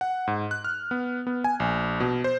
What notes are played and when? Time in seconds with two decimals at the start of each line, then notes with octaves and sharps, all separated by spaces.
0.01 F#5
0.27 G#2
0.51 F#6
0.64 F6
0.91 B3
1.27 B3
1.44 G#5
1.60 A#1
2.00 B2
2.24 C5